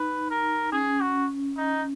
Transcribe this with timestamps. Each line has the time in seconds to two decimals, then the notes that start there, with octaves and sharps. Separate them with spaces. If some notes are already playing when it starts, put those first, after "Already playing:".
Already playing: D#4 B4
0.31 A#4
0.72 C#4 G#4
1.01 F#4
1.57 D#4